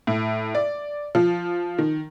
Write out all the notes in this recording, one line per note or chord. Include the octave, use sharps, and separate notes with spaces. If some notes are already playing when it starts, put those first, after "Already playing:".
A2
D5
F3
D#3